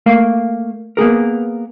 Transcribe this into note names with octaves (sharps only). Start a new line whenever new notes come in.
A3 A#3 F5
A#3 B3 G#4 A#4